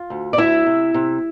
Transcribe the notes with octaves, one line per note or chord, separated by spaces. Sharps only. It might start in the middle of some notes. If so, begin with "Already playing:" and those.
Already playing: F4
D2
D5
D2 E4 E5
C3
C3